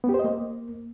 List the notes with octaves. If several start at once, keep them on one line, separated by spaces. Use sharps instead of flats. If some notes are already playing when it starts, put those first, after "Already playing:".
B3
G4
C5
D#5
A#3